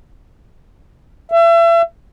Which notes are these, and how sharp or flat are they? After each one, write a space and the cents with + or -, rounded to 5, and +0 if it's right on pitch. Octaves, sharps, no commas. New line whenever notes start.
E5 +35